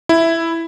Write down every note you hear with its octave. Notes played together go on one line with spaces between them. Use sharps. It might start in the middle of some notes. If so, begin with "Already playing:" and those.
E4